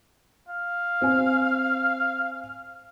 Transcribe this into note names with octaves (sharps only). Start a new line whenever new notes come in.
F5
C4 G#5